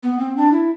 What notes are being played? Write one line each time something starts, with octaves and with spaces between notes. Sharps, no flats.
B3
C4
D4
E4